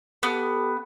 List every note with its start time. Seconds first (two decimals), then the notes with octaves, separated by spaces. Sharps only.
0.23 B3 G4 A4